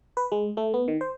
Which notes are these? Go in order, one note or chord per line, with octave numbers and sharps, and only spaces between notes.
B4
G#3
A3
B3
D#3
C5